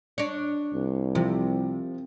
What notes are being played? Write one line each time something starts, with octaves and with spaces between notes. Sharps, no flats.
D4 C#5
C2
C3 F3